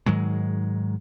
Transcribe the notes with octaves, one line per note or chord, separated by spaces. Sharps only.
G#2 D#3 F#3 G#3